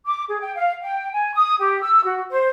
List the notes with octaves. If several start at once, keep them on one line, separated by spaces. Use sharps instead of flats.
D6
G#4
G5
F5
G5
G#5
D#6
G4
E6
F#4
C5